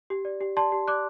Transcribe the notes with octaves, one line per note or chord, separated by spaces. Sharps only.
G4
D5
G4
D5 A5 C6
G4
D5 D6 F#6